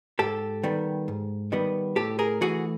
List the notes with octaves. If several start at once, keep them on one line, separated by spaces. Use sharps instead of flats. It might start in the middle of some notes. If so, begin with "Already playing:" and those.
G#2 G4 A4
D#3 G3 B3
G#2
D#3 G3 B3
A2 G4 A4
G#4 A#4
E3 A3 F#4 G#4